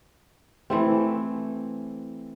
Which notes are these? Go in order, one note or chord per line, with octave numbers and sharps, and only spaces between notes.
E3 A3 C4